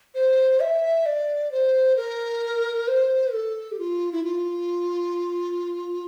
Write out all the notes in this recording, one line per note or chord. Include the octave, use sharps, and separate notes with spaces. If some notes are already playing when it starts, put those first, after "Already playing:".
C5
E5
D5
C5
A#4
C5
A4
G4
F4
E4
F4